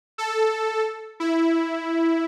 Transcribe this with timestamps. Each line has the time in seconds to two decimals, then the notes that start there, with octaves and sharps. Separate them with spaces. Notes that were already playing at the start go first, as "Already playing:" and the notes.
0.18 A4
1.20 E4